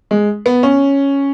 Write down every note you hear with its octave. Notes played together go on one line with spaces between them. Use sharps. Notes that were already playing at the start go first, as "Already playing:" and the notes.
G#3
B3
C#4